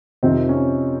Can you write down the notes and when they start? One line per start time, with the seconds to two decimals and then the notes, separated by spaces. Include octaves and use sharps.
0.23 F2 C3 D#3 C4
0.49 C#4